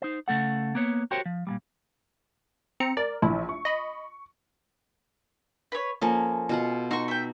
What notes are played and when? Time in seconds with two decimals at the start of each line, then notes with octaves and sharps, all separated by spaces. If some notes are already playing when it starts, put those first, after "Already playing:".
0.02 D#4 C5
0.28 C#3 A3 A4 F#5
0.75 A#3 B3 C#5
1.11 F#4 G4 A#4 C5 C#5 G5
1.25 F3
1.47 A#2 F3 G3
2.80 C4 A#5 C#7
2.97 A#4 D5
3.22 A#1 E4
3.49 C#6
3.65 D#5 B5
5.72 B4 C#5
6.02 F3 A#3 C#4 A4
6.49 B2 F4 F#5
6.91 D#4 F#4 C6 C#6
7.08 E5 G5